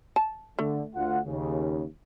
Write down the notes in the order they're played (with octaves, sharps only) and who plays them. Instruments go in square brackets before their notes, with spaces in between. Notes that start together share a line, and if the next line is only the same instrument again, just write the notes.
[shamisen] A5
[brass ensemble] D3 [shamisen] A3
[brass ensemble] D2 F4 F#5
D#2 C#3